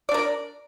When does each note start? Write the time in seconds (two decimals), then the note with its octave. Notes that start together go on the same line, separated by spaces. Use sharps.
0.09 D5
0.11 D4
0.14 A#4